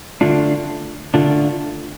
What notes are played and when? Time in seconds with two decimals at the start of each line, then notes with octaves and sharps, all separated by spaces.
0.21 D3 A3 D4 F4
1.14 D3 A3 D4 F4